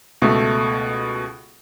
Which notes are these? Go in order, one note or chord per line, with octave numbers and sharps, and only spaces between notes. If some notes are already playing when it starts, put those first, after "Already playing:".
C#2 B2 A3